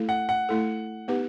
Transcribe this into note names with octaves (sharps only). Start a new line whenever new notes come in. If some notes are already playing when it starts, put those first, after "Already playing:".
Already playing: A3 E4 A4
F#5
F#5
A3 E4 A4
B3 D#4 G4 B4